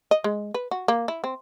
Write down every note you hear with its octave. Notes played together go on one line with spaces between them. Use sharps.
D#5
G#3
B4
F#4
A#3
E4
C4